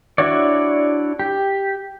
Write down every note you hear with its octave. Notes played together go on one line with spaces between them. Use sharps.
D4 E4 F#4 C#5 D5
G4